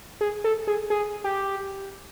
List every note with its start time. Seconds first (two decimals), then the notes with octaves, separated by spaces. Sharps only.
0.21 G#4
0.44 A4
0.67 G#4
0.90 G#4
1.24 G4